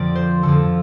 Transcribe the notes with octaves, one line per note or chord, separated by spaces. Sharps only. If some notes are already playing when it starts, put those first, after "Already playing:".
Already playing: F2 D3 F3 D5
C5
F2 D3 F3 A4